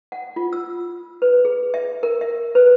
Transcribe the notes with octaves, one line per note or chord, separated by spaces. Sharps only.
F#5
F4
E6
B4
G#4
E5
A#4
E5
B4